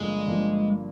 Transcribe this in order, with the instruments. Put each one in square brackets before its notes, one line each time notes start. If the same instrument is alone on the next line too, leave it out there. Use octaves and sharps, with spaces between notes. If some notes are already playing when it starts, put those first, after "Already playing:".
Already playing: [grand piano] G1 G2 F3 A#3 [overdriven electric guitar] G#3
[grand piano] G1 G2 F3 A#3